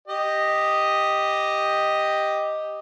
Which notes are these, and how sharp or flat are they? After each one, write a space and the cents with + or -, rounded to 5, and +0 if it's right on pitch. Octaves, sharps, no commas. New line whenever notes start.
G4 +0 D#5 +0